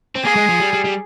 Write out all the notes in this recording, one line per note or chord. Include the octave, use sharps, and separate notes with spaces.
C4
A#3 G#4
G#3
F3
G3
G3
G3